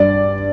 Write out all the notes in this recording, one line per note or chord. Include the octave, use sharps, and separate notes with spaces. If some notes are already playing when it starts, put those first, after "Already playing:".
Already playing: G2 D5